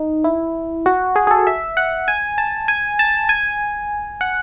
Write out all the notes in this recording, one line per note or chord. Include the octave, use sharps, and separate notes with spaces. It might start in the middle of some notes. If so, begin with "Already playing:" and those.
Already playing: D#4
E4
F#4
G#4
G#4
A4
E5
F#5
G#5
A5
G#5
A5
G#5
F#5